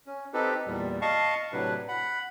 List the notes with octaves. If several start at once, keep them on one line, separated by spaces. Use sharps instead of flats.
C#4
C4 D#4 G4 A4 B4
E2 A#2 G3
D#5 F5 A5 C#6
A2 C3 F#3 D4 B4
F#5 B5